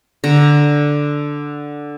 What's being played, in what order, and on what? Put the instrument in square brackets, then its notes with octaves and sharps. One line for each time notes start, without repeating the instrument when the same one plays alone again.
[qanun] D3 A#5